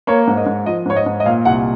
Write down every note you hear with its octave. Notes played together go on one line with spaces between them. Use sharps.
A#3 C#5
G#2
D#5
G#2
F3 D#5
G#2 C#5
D#5
G#2
D#5
A#2 F5
C2 F#5